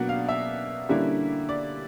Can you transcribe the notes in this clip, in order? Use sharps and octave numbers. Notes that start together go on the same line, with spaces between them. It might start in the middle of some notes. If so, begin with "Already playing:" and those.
Already playing: B2 F#3 A#3 D4 F#5
F5
E5
D3 G3 A#3 C#4 E4
D5